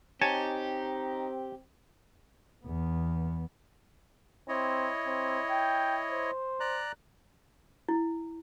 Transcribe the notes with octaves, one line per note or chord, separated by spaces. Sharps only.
C4 D#4 G4 C#5 G#5 A5
E2 B3
C4 E4 C#5 D#5
C4
G5
C5
D5 A#5 F#6
E4